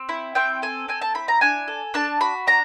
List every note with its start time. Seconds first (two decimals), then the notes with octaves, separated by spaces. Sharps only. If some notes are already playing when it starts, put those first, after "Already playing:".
Already playing: C4
0.09 E4
0.35 C4 G5
0.62 A4 G#5
0.88 C4 G#5
1.01 A5
1.14 E4 B5
1.28 A#5
1.41 D4 G#5
1.68 A4
1.94 D4 A5
2.21 F#4 B5
2.47 D4 A#5